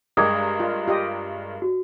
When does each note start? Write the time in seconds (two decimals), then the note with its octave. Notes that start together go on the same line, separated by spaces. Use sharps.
0.17 G2 G#3 D4 A#4 G5 D6 D#6 G#6
0.60 F4
0.88 F4 G4 D#5
1.62 F#4